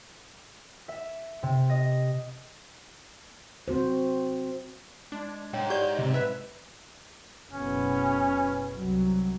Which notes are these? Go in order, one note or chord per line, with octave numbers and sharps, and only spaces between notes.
E5
C3
D#5
C4 F#4 C5
G#3 D4
G#2 C#5 G5
G4 D5 G6
C3
B4 E5
F#1 B2 B3 C#4
C2 F#3